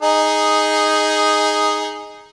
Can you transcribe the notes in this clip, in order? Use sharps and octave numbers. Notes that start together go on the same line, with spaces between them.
D#4 G#4